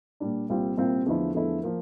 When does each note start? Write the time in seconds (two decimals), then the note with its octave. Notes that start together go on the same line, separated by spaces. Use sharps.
0.20 A#2 G3 D4
0.49 C2 A#2 G3 C4 F4
0.77 C2 A#2 G3 C4 F4
1.06 E2 D3 F3 A3 E4
1.35 E2 D3 F3 A3 E4
1.63 F3 A#3